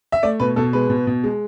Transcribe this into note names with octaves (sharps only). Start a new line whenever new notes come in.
E5
A3 D5
B2 B4
B2 A4
G#3 B4
B2
B2
G#3